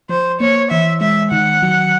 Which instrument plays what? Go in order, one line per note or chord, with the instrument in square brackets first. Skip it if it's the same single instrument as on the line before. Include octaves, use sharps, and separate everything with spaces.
[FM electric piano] F3 [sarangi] C5
[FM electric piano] A#3 [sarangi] C#5
[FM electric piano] E3 [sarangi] E5
[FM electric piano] G#3 [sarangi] E5
[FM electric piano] D#3 [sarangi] F#5
[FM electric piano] F#3